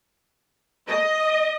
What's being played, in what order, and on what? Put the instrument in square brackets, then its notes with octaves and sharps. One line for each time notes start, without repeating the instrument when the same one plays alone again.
[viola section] D#5